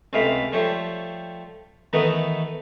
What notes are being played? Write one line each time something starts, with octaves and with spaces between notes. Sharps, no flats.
C#2 C3 G#3 A3 F5 B5
F3 G3 A3 C5 C#5
D#3 E3 A3 B3 D#4 F#4